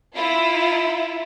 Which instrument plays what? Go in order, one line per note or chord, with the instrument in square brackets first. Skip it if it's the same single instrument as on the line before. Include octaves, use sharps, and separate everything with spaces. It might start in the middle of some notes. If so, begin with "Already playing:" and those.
[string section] E4 F4